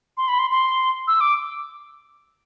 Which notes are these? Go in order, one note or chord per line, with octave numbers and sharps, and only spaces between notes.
C6
B5
C6
C6
E6
D6